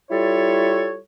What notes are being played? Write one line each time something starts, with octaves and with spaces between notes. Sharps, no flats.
G3 E4 F4 A4 C#5